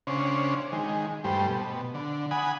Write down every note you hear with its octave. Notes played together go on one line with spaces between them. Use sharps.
C#3 C#4 D4 C5
D#3 G#3
G2 G3 A3 C5
B2
D3
F#5 G#5 B5 D#6